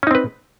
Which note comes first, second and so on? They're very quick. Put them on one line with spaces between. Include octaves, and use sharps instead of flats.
C#4 D#4 C4 B4